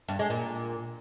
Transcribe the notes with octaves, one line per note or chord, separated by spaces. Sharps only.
G2
G#3
A#2